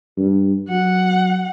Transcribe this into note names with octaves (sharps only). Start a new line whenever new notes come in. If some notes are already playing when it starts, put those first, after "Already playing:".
G2
F#3 F#5